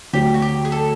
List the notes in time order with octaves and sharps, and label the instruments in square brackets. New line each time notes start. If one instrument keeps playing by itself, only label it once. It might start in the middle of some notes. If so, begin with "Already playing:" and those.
[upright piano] D2 D3 F#3 [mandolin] G4
[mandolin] F#4
G4
G#4
A4